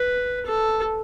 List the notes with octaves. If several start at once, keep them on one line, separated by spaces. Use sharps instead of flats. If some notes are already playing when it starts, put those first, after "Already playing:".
Already playing: B4
A4